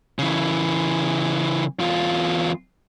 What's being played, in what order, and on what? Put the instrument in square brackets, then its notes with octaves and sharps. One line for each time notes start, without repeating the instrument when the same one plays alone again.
[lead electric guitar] C#3 E3
E2 F4